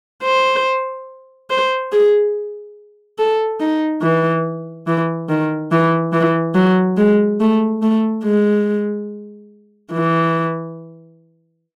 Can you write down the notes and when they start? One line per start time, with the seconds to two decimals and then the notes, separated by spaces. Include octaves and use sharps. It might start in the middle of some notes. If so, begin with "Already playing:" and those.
0.24 C5
1.50 C5
1.92 G#4
3.19 A4
3.60 D#4
4.02 E3
4.87 E3
5.29 D#3
5.72 E3
6.13 E3
6.55 F#3
6.97 G#3
7.40 A3
7.82 A3
8.24 G#3
9.92 E3